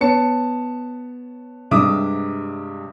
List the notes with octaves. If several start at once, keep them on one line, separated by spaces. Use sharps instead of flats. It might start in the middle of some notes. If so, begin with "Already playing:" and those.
B3 C#5 A5 C#7
G2 C3 G#3 E5 D6 D#6